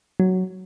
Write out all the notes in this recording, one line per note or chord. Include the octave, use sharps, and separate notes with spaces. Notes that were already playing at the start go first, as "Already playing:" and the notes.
F#3